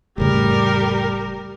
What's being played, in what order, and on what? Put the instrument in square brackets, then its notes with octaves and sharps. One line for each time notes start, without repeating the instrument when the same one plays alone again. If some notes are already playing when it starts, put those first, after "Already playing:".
[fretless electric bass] F1 A2 C#3 [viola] G3 A#4